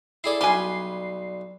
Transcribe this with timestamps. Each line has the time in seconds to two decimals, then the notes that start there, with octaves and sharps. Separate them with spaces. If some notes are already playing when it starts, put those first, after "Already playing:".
0.24 E4 G#4 A4 D5 C7
0.41 B1 G3 B4 G#5 C6